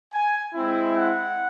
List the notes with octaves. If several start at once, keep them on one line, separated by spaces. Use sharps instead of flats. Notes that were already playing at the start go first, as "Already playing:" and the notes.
G#5
G#3 C4 E4
F#5